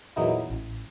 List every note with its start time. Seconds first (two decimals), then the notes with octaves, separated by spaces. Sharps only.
0.16 E2 A#2 E3 F#3 D#4 E4
0.50 A1